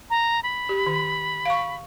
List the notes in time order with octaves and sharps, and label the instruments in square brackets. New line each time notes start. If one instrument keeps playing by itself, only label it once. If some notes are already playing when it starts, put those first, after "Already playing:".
[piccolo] A#5
B5
[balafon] G4
D#3
F5 C#6